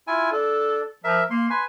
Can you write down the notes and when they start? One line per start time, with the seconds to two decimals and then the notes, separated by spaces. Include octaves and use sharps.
0.07 E4 F4 G#5
0.32 D4 A4
1.04 F3 A#4 E5
1.30 A#3 C6
1.50 B4 G#5 C6